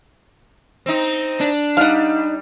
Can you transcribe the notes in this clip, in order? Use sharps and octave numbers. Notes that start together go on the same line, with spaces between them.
C4 D#4
D4
G3 D#4 F5 F#5